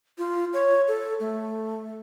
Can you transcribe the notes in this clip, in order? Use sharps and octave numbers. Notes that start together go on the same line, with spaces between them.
F4
C#5
A4
A3